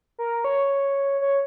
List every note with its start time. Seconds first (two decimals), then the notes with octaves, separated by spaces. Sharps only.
0.18 A#4
0.44 C#5
1.21 C#5